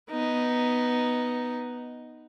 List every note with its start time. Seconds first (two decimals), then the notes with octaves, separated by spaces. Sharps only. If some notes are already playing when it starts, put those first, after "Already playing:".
0.10 B3 D#4